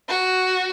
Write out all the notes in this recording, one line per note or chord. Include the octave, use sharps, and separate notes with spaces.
F#4